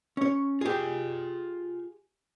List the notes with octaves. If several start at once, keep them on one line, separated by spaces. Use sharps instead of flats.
C#4 C#5
F4 G4 G#4 G#5